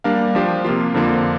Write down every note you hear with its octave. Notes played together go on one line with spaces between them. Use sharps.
G3 A#3 D4 A#4 F5
F3 D4 G4 C5
C3 F3 A#3 F4
F2 D3 F3 A#3